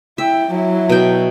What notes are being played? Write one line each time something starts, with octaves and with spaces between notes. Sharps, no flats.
E4 E5 G5
F#3 E4
B2 G5